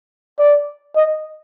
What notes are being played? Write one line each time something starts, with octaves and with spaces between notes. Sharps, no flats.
D5
D#5